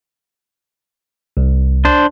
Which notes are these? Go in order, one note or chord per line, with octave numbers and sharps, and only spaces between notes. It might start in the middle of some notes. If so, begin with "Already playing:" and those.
C2
D4 C5